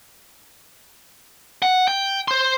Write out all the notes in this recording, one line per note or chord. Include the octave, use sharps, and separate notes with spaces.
F#5
G5
C5 C6